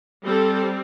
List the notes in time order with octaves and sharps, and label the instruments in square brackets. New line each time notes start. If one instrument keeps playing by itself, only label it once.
[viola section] G3 C4 A4